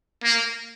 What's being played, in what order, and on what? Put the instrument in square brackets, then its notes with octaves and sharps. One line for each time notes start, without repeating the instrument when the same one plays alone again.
[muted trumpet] A#3